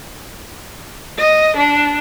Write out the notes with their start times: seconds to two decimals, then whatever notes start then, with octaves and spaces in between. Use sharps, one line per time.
1.18 D#5
1.57 D4